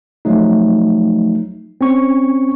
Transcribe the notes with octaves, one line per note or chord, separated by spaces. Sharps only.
F3 F#3 A3 D#4
C4 C#4 C#6